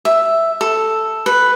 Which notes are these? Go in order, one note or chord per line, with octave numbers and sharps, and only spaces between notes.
E5
A4
B4